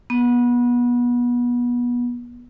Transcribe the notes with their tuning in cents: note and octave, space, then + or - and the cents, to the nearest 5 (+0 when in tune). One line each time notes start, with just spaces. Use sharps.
B3 -25